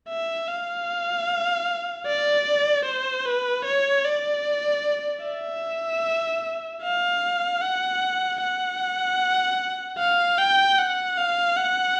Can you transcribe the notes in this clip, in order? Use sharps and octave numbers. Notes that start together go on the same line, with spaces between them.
E5
F5
D5
C5
B4
C#5
D5
E5
F5
F#5
F#5
F5
G5
F#5
F5
F#5